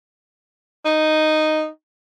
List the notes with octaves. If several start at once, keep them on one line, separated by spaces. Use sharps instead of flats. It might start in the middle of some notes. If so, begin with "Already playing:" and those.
D#4